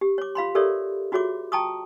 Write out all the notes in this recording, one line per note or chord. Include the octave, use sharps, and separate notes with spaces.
G4
C#5 D6
F4 F5 B5 C6
G4 A4 A#4 C#5 D5 E5
F4 F#4 G#4 C#5 E5 D6
G5 A5 A#5 C#6 D#6